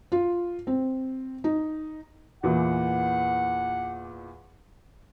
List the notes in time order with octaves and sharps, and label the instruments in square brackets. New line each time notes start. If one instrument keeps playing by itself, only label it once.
[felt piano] F4
C4
D#4
[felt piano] E2 A#2 E3 [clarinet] F#5